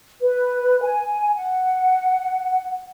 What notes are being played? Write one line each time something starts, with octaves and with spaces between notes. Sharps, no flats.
B4
G#5
F#5